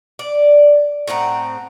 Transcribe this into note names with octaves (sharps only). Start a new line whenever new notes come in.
D5
A2 C4 F#5 A#5